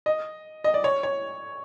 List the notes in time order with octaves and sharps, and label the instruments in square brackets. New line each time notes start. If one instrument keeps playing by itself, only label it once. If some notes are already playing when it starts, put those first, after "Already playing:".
[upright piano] D#5
D#5
D5
C#5
C#5